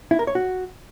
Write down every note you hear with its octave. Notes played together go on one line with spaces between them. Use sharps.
E4
A#4
C#5
F#4